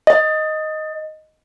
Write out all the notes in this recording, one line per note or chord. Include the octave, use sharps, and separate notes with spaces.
D#5